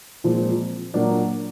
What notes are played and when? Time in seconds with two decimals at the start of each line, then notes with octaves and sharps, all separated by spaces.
0.24 A#2 F3 G#3 C4
0.94 A#2 F#3 A#3 D4 F4